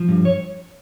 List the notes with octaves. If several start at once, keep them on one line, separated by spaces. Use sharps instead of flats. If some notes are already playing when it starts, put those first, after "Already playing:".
Already playing: F3
G2
C#5